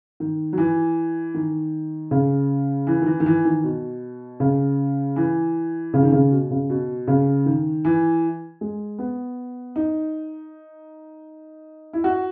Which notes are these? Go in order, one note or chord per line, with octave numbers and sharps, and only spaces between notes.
D#3
F#3
E3
D#3
C#3
E3
D#3
E3
D#3
E3
D#3
B2
C#3
E3
C#3
D#3
C#3
B2
C#3
B2
C#3
D#3
E3
G#3
B3
D#4
E4
F#4